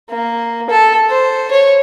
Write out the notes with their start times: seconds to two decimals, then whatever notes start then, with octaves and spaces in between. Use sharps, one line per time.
0.10 A#3
0.69 A4
1.10 C5
1.51 C#5